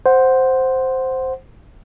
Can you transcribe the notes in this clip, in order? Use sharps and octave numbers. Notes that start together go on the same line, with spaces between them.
C5 F#5